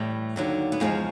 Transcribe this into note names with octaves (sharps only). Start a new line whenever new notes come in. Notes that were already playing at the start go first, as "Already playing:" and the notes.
Already playing: A2 E3 G3
D#2 D3 F#3
B3
E2 C#3 F3 G#3 A#3